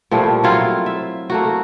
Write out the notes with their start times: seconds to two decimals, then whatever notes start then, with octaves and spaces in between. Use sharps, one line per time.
0.11 A#2 F3 G3 A3
0.43 F#3 C4 E4 F4
0.86 E5
1.30 A3 A#3 F#4